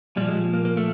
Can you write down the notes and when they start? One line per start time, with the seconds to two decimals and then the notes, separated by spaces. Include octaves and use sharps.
0.17 A#2 G3
0.21 F3
0.28 G#3
0.53 A#3
0.65 A#3
0.77 A3